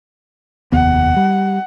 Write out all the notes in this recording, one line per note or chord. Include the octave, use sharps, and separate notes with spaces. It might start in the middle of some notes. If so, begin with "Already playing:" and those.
F1 D#2 B3 F#5
G3